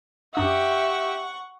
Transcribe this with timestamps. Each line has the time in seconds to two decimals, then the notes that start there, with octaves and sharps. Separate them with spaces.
0.35 F#2 D4 G4 E5 F#5 C#6 D#6